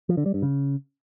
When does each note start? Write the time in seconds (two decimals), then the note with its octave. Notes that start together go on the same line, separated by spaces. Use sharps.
0.09 F3
0.17 D3
0.26 G3
0.34 G2
0.42 C#3